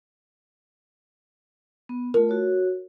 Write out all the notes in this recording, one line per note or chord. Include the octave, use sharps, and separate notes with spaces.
B3
A3 F4 A#4
F#4 C#5